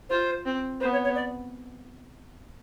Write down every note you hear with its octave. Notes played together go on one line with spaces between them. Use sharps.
F4 C5
C4
B3 C5
C#5
C#5
D5